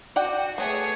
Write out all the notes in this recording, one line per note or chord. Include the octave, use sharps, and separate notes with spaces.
F#4 D5 F#5 G5
A3 B3 G#4 C#5